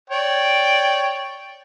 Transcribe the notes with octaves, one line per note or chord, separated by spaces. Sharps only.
C#5 D5 G5